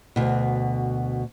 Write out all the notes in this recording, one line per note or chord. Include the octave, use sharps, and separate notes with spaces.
D2 B2